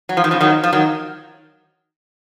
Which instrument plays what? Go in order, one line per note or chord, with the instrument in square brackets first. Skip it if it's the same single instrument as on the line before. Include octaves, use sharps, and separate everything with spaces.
[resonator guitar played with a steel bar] F#3
F3
D#3
C#3 F3
D#3 F#3
F3
D#3 F#3